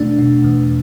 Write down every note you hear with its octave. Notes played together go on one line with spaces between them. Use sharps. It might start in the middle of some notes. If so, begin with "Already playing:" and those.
Already playing: E2 B2 A3 D4
B2
E2